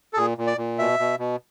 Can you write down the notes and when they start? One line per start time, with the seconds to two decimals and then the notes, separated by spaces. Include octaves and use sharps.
0.13 A4
0.17 A#2 G#4
0.38 A#2
0.47 D5
0.58 A#2
0.79 B2 E5
0.99 B2
1.19 B2